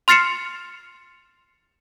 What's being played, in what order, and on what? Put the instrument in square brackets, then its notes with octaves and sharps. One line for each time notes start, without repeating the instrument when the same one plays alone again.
[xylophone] C6 F6 A6 C7 C#7 E7